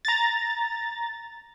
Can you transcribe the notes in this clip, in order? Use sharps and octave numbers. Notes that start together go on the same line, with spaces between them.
A#5 A6